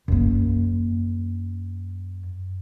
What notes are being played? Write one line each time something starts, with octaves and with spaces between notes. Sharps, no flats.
F#2 A#3